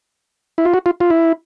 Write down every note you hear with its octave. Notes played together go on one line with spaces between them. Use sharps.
E4
F4
F#4
F4
F4
E4